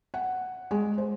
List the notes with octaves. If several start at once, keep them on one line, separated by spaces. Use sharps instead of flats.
F#5
G#3
C5